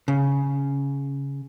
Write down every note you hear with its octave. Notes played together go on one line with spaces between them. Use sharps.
C#3